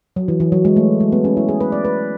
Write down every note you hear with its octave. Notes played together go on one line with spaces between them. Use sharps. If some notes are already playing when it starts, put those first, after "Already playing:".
F#3
E3
E3
F#3
G#3
A3
G#3
B3
C#4
E4
G#4
B4
D5
B4